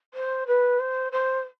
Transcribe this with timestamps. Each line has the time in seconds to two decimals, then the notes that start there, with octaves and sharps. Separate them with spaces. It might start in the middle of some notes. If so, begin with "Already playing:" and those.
0.14 C5
0.47 B4
0.79 C5
1.12 C5